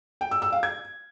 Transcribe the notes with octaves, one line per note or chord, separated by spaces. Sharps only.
G5
E6
E6
F5
G#6